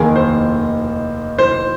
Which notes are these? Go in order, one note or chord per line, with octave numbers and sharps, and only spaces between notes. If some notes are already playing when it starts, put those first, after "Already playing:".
Already playing: F1 D#2 D#3 G#4
C5
C5